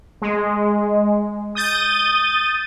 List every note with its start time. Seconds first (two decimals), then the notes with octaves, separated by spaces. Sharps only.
0.22 G#3
1.55 D#6 G6 A6 D#7